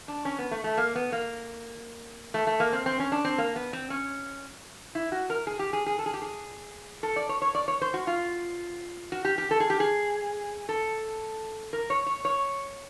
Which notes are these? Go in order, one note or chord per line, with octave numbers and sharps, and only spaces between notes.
D4
C#4
B3
A3
A3
A#3
B3
A#3
A3
A3
A#3
C4
C4
C#4
D4
C4
A#3
B3
C4
C#4
E4
F#4
A#4
G#4
G4
G#4
G#4
A4
G#4
G4
G#4
A4
D5
C#5
C#5
D5
C#5
C5
F#4
F4
F#4
G4
G4
A4
G#4
G4
G#4
A4
A#4
C#5
C#5
C#5